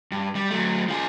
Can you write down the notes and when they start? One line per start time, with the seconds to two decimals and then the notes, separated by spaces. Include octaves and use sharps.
0.12 G2
0.35 G3
0.51 F#3 A3
0.88 F3 G#4